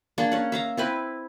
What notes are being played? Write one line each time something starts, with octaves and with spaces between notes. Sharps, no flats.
A#3 D4 G#4
C#4 F#5
E5 F5 A#5
C4 E4 B4